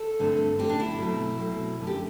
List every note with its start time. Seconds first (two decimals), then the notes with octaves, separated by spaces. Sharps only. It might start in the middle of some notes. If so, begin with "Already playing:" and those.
Already playing: A4
0.19 G2 D3 A3 C4
0.59 G2 D3 A3 C4 G4
0.69 D4
0.80 E4
0.99 B2 F#3 A3 C4
1.39 B2 F#3 A3 C4
1.79 F#2 D3 A3
1.87 G4